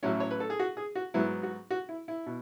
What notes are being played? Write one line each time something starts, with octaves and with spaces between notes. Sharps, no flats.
A1 A2 F#3 C#4 E4
C#5
B4
A4
G#4
F#4
G#4
F#4
G#2 F#3 B3 E4
F#4
F#4
E4
E4
B2